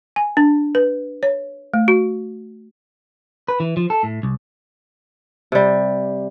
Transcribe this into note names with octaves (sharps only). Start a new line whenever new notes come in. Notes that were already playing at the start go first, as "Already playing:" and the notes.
G#5
D4
B4
C#5
A3
F#4
B4
E3
F3
A4
A2
C2
C3 G3